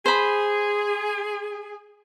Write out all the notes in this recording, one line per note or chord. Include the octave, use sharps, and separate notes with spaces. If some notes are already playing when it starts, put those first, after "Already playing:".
G#4 C5 B5